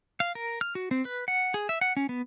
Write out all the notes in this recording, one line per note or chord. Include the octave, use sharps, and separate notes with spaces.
F5
A#4
F6
F#4
C4
B4
F#5
G#4
E5
F#5
C#4
B3